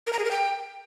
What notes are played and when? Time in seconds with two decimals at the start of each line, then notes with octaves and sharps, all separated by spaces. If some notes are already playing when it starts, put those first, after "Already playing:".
0.07 A#4
0.13 A#5
0.19 G#4
0.25 A#4
0.31 G5